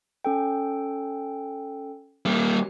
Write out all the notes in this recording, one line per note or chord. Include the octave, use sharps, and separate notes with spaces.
C#4 A4 G5
G3 A#3